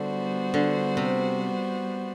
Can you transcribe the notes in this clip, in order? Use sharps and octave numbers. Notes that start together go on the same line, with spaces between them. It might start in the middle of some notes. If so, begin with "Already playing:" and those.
Already playing: D3 G3 B3 F#4 C5
D3
C3